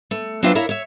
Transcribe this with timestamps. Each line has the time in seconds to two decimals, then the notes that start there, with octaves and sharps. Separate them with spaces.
0.11 A3
0.43 F#3 B3 C4 D4 F4 E5
0.55 E4 A#4 C#5 D5 E5 F5
0.69 C#5 E5